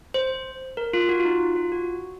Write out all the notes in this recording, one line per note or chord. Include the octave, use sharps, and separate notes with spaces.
C5
A#4
F4
F#4
F4
D#4
F4
F#4